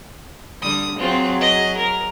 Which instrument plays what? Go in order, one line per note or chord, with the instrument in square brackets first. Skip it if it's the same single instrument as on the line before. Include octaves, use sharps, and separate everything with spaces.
[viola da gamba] D3 G3 [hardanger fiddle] D#6
[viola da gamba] F#3 G#4 [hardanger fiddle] C4 F4
[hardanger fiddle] D#5
A#4